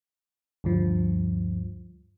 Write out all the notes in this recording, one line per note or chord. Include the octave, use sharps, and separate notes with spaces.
D2 G2 F3